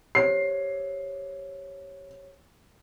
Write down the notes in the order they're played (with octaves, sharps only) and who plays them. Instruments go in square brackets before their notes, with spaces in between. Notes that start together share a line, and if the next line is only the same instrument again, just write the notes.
[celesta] G4 C5 C#5 [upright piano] C7